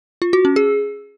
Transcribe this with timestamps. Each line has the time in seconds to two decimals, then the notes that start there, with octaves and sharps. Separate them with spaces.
0.22 F4
0.33 F#4
0.45 C#4
0.56 G#4